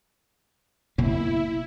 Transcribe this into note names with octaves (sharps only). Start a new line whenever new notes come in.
F#1 B2 A#3 E4